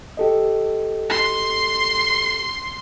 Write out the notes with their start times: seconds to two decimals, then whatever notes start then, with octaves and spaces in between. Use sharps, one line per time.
0.17 G4 A4 D#5
1.10 C6